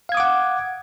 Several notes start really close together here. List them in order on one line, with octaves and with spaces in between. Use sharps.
F5 G#6 D#6 D6 F#5